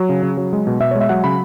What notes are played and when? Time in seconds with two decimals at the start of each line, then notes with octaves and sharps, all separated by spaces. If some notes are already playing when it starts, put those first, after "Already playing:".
Already playing: F#3
0.09 C#3
0.23 C#3
0.37 F#3
0.53 G#3
0.67 B2
0.80 B2 E5
0.91 G#3 C#5
1.01 E5
1.09 F#3 F#5
1.24 C#3 B5